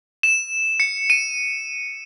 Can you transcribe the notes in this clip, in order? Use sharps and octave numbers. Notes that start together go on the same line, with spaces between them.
E7
C#7
D#7